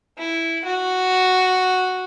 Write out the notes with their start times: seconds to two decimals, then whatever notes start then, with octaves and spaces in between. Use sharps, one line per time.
0.18 E4
0.65 F#4